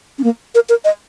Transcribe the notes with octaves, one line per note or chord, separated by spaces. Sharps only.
C#4
A#3
A#4
A#4
D#5